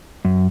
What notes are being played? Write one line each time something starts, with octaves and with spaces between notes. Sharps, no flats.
F#2